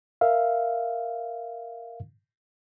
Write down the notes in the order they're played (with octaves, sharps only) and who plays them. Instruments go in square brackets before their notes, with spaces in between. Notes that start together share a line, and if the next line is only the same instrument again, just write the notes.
[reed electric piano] A#4 E5 F5